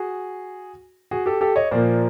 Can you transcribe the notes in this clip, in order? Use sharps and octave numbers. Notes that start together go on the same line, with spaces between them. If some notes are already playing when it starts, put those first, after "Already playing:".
Already playing: F#4 G#4
F#4 G#4
G4 A4
G4 A4
C#5 D#5
A#2 F3 A#3 C5 D5